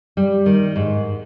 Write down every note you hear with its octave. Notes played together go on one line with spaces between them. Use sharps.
G3
D#3
G#2